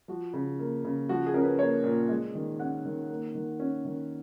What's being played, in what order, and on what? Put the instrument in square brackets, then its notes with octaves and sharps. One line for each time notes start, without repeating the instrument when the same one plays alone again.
[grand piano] F3 F#4
C#3
A#3
C#3
F3 F#4
G#4
C#4 A#4
B4
A#3 C#5
A#2
G#3 D#5
D#3
C#4 F#5
D#3
A#3
D#3
C#4
D#3